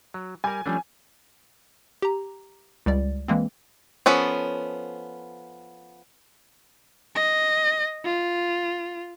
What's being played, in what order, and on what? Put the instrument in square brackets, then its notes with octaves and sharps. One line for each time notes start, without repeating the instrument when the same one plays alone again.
[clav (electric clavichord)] F#3
[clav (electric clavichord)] G3 A#4 [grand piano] G#5
[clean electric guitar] F3 C#4 [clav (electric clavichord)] G3 A3 D4
[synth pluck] G4 A#5
C#2 G3 D5
E3 G#3 A#3 C4
[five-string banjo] F3 B3 C#4 A4 B5
[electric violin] D#5
F4